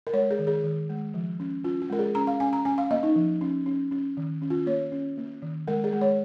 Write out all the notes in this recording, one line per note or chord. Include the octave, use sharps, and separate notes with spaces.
A#4
G#3 C#5
G#4
D#3
G#4
D#3
G#3
F3
C#4
C#4 F4
F4
G#3 A#4
G#4
C#4 A#5
F5
C#4 G#5
A#5
C#4 G#5
F5
A#3 D#5
D#4
F3
C#4
C#4
C#4
D#3
C#4
F4
A#3 C#5
C#4
A#3
D#3
G#3 A#4
G#4
G#3
C#5